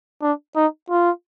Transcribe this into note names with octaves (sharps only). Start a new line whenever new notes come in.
D4
D#4
F4